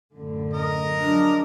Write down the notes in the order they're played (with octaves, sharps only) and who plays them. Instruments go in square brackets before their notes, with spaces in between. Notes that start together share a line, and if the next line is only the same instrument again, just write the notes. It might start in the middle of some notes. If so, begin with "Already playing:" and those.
[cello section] F#2 A2 D3
[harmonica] A#4 D#5
[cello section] F3 F#3 G#3 [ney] D4